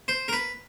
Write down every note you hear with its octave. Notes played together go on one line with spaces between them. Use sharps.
C5
A#4
B4